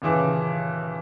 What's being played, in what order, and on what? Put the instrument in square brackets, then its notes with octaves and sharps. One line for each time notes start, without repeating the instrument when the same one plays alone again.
[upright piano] D#1 C#3 E3 D6